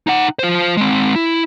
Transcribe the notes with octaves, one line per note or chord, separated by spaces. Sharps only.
D#4 F#5
F4 C5
G#3 C4
E4